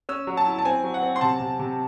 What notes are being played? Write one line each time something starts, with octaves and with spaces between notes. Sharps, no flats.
C#4 E6
F#3
A5
E4
A5
C4 G#5
F#3
F#5
C4
C6
C3 A5
C3
C3